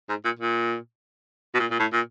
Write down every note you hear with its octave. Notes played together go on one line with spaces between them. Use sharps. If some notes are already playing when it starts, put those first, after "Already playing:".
G#2
A#2
A#2
B2
A#2
A#2
A2
A#2